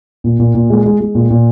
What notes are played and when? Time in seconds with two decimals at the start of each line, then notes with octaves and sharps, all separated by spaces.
0.24 A#2
0.39 A#2
0.54 A#2
0.70 G#3
0.86 G#3
1.00 G#3
1.15 A#2
1.30 A#2